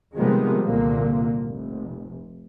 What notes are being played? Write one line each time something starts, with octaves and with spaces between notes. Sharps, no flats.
C3 D#3 F3 G3 G#3 B3
C2 A#2 D3 A#3
F1